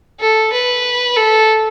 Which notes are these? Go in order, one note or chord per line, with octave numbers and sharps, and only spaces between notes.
A4
B4
A4